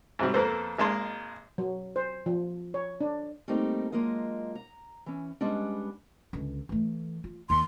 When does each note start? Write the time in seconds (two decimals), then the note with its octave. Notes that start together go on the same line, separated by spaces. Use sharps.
0.19 G#2 C3 F#3 G3
0.34 F2 A#3 B3 A4 C5
0.78 G#1 G#3 A#3 A5 C6
1.58 F#3
1.96 C5
2.26 F3
2.74 C#5
3.01 D4
3.48 G3 A3 A#3 C4 D#4 G4
3.92 F#3 G#3 A#3 D4 F4 D#5
4.55 A#5
5.06 E3 C#4
5.41 G3 G#3 B3 C#4 D4
6.33 C#2 D3
6.69 E3 A3
7.24 F4
7.50 D#2 C6